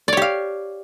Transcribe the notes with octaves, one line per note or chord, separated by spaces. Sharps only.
G4 C#5 D5 F5